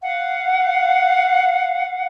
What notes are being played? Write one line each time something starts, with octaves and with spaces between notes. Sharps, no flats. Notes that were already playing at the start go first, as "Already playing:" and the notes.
F5 F#5